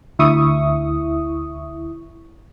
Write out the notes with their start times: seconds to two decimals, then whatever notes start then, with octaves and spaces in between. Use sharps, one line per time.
0.19 D2 E4 E5 C#6 D#6